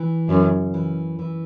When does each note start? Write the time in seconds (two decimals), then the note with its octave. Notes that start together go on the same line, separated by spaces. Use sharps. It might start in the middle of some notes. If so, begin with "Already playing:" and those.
Already playing: E3
0.29 F#2 C#3
0.74 E3
1.19 E3